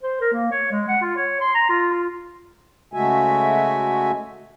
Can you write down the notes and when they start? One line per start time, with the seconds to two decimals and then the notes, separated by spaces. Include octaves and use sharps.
0.03 C5
0.21 A#4
0.32 A#3
0.51 C#5
0.71 G#3
0.88 F#5
1.02 F4
1.16 C#5
1.40 C6
1.55 A#5
1.69 F4
1.92 F4
2.94 C#3 G#3 A3 F#4 E5 G#5